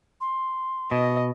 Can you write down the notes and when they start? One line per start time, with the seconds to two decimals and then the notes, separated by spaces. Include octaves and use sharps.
0.21 C6
0.91 B2 D#5